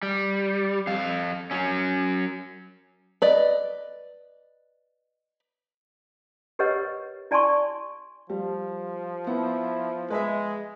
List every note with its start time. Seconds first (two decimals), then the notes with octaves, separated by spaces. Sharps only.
0.03 G3
0.87 F2 F5
1.51 F#3 C#4
3.22 B4 D5 D#5
6.59 G4 A#4 B4 C#5 D#5 F#5
7.31 E4 D5 G#5 A5 C6 C#6
8.30 F3 G3
9.27 B3 E4
10.10 G#3 B4 D#5 E5